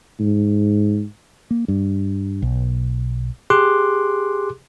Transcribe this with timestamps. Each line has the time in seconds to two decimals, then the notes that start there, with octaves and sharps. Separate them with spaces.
0.20 G#2
1.51 A#3
1.68 G2
2.42 B1
3.50 G4 G#4 C6 D6 F#6